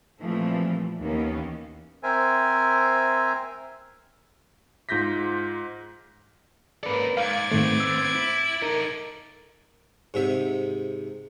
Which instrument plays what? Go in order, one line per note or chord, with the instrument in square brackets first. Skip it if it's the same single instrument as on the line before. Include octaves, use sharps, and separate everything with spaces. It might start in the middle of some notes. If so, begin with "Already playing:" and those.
[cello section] A#2 E3 F3 G3 A3 C4
D#2 D#3 E3 A#3 B3 C#4
[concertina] C4 A#4 C5 E5 G#5
[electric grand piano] G#2 F4 G6 A#6 B6
[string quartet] G#2 A#3 [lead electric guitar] C#4 A4 [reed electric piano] B4 D5
[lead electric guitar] G#2 [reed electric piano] F5 [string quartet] D6 G#6 A6
[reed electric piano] G#2 D#3 A3 [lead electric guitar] B3 C4
[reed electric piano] E6
[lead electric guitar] E4
[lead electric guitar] D#4 A4 [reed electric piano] A#4
[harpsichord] G#2 C3 E5